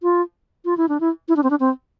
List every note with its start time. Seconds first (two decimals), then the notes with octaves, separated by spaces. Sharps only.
0.03 F4
0.65 F4
0.77 E4
0.89 D4
1.00 E4
1.28 E4
1.36 D4
1.43 C4
1.50 D4
1.60 C4